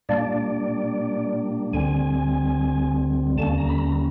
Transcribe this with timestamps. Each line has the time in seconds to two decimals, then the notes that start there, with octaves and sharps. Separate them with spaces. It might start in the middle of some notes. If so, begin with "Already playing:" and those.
0.09 A#2 G3 A#3 D4 D5
1.73 D2 D3 G3 C4 G#5
3.38 D#2 D3 G3 A#3 C#4 A5
3.58 A#5
3.69 B5
3.78 A#5